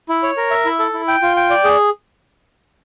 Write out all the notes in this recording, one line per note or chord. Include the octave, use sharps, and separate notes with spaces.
E4
C#5
A#4
E5
E4
A4
E4
G5
F4
G5
D5
G#4